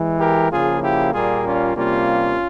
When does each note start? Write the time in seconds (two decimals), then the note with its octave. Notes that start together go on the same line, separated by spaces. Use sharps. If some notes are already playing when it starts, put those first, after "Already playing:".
Already playing: E3 G#3
0.19 G4 A#4
0.51 C#3 F3 A#3 F4 G#4
0.82 E4 G4
1.13 A#2 G3 A#3 F4 G#4
1.44 C#4 F4
1.75 C3 G3 A#3 C#4 F4